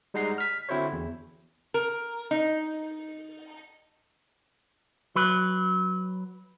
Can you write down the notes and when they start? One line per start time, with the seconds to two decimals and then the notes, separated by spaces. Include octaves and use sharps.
0.14 G3 G#3 D#4 F#5 A#5 C7
0.38 F6 B6
0.69 D3 C4 E4 F#4 C5 C#5
0.93 E2
1.74 A#4
2.31 D#4
5.16 F#3 B4